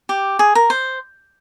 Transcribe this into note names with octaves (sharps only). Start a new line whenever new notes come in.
G4
G#4
A#4
C5